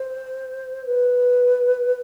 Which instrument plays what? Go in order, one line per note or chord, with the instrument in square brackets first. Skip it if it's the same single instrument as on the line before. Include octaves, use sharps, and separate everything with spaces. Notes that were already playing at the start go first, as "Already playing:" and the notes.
Already playing: [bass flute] C5
B4